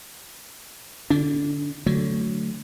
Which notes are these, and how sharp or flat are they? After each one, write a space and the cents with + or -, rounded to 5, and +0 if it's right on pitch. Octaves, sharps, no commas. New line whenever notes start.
D3 +0 D4 -30
D3 -10 F#3 +0 A3 +0